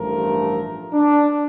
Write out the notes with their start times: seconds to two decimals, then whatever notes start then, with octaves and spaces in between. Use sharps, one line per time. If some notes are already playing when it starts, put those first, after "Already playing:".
Already playing: A1 G2 F3 A3 A#4
0.92 D4